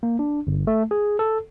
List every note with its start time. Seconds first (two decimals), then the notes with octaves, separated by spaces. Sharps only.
0.03 A#3
0.19 D4
0.47 G1
0.67 A3
0.91 G#4
1.19 A4